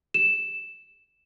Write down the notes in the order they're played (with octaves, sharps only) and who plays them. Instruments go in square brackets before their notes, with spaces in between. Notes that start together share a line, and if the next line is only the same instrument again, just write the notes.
[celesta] E7